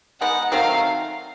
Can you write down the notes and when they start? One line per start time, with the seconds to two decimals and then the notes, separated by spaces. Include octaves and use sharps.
0.21 G#3 B3 D#4 F#5
0.52 D#3 F#3 A3 C4 F5